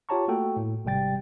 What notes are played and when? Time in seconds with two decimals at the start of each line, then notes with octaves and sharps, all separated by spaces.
0.09 F4 G4 C#5 A5 A#5 C#6
0.28 A3 A#3 F#4 A4 G5
0.57 A2
0.85 G#1 C3 G3 G5 A6